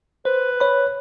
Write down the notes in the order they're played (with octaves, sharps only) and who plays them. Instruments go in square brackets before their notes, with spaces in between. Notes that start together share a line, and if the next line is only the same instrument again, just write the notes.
[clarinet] B4 [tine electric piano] C5
[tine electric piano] C#5 B5